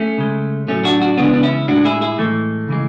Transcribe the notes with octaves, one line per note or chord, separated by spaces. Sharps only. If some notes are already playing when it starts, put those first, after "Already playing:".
Already playing: A3 C#4
C#3 G#3
A2 F#3 A3 C#4
D4 F#4
D4 F#4
C#3 E3 G#3 B3 D4
D4
C#4 E4
A2 G#3 D4 F#4
E4 G#4
E4 G#4
A2 E3 G#3 A3
C#3 E3 G#3